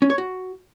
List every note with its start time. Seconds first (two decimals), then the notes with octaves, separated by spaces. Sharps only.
0.02 C#4
0.10 C#5
0.18 F#4